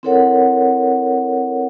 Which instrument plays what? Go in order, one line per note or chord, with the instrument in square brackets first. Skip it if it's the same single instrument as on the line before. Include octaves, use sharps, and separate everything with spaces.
[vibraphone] C4 E4 A4 A#4 C#5 F#5